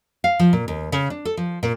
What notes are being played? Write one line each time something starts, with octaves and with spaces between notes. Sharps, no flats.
F5
F3
A#2
D#2
C#3
D4
A4
F3
A#2